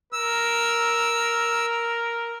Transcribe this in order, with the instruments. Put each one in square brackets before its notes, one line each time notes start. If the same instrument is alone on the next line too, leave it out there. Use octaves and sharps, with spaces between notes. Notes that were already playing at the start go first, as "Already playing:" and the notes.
[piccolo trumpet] A#4 [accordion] E6